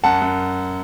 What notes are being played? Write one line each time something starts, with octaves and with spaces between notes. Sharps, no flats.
F#2 F#5 A5
F#2